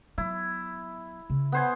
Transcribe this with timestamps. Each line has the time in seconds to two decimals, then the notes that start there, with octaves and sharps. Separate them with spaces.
0.18 F#3 B3 E4
1.30 C#3
1.52 B3 C5 G#5